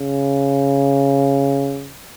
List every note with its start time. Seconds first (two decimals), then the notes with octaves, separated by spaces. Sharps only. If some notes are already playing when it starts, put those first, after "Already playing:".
Already playing: C#3